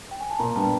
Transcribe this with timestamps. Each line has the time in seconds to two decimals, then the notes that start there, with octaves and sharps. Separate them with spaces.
0.11 G5
0.21 G#5
0.30 A5
0.39 A#2 A#5
0.55 G3 B3 D4 A5